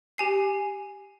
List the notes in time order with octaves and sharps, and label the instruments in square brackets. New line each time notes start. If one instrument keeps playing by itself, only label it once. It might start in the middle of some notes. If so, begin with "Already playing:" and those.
[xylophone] G4 G#5 C7